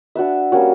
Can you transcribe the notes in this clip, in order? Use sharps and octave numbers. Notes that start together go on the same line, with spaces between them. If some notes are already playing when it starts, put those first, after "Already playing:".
D4 F#4 B4 E5
G3 A#3 C#4 F#4